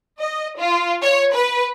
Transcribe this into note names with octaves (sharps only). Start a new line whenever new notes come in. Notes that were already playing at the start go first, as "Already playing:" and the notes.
D#5
F4
C#5
B4